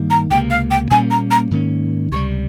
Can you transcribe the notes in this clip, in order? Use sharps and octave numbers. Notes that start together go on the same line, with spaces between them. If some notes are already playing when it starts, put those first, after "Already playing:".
Already playing: G2 D#3 G3 A#3
A#5
C#2 C3 F3 A#3 G5
F5
G5
A#2 G3 A#3 C#4 G#5
A#5
A#5
G#2 D#3 A#3 C#4
C#2 C3 D#3 G3 C#6